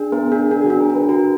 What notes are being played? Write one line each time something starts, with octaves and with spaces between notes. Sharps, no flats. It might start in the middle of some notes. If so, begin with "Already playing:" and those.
Already playing: D4 G#4
B3 A#4
D4 G#4
D4 G#4
G#4
F#4
D4
A#4
D4 B4
F#4 A#4